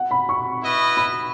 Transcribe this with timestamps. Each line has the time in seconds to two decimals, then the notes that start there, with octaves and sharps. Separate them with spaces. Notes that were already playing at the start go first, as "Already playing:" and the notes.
Already playing: F#5
0.11 B5
0.29 C#6
0.63 E4 B4 D#5
0.97 B5